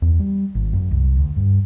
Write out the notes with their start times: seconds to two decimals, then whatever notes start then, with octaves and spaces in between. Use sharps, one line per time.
0.02 E2
0.19 G3
0.55 G#1
0.73 F#2
0.91 C2
1.16 D2
1.36 G2